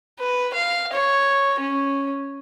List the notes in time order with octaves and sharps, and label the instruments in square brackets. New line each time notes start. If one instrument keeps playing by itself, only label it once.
[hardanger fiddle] B4
F5
C#5
C#4